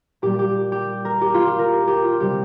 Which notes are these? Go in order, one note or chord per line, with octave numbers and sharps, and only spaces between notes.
A#2 G3 G4
G4
G4
A#4
G4
F4
G4
A#4
G4
F4
C3 G3 G4